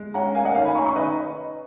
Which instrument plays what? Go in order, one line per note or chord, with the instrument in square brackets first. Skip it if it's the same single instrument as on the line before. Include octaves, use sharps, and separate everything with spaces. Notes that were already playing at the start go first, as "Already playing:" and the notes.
Already playing: [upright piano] G#3
C#4 F#5 A#5
A#3 F5 G#5
D#5 F#5
D#3 C#5 F5
G#5 B5
C#4 A#5 C#6
A#5 C#6
D#3 B4 D#5